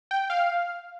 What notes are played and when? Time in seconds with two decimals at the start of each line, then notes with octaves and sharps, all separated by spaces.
0.11 G5
0.30 F5